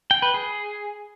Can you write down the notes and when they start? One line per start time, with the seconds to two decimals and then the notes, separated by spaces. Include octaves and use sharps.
0.11 G5
0.22 B4
0.34 G#4